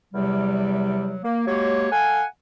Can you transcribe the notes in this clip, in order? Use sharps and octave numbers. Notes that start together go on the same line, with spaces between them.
E2 C3 F#3 G3
A#3
F#3 G#3 A#3 G4 C#5
A4 F5 F#5 G#5